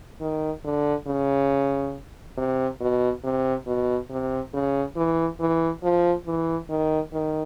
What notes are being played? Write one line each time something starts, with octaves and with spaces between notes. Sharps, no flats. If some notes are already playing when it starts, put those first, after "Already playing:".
D#3
D3
C#3
C3
B2
C3
B2
C3
C#3
E3
E3
F3
E3
D#3
D#3